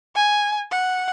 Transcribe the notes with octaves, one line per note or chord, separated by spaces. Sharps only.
G#5
F#5